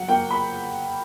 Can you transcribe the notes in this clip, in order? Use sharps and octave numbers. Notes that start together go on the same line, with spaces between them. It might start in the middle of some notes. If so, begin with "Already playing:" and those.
Already playing: F#3 F#5
A#3 G5
B5